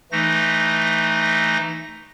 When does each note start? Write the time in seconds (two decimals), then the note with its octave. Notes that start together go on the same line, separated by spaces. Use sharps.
0.12 E3 A3 D#4 A#6